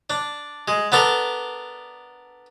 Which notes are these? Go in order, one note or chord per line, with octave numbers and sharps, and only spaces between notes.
D4
G#3
B3 D4 A4 A#4